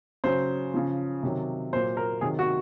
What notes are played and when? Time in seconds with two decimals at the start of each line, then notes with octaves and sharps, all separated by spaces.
0.24 C#3 F#3 C5
0.74 C#3 F3
1.23 C3 D#3 F#3
1.72 A#2 F#3 C5
1.97 A#4
2.21 C3 D#3 F#3 G#4
2.39 F#4